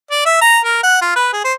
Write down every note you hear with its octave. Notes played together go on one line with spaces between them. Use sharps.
D5
E5
A#5
A#4
F#5
F4
B4
G#4
C5